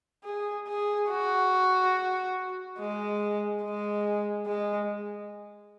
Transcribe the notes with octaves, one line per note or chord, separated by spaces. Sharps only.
G#4
G#4
F#4
G#3
G#3
G#3